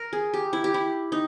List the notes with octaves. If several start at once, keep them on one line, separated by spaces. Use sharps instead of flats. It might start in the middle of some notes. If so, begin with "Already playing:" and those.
Already playing: A#4
G#4
G4
E4
G4
E4
D#4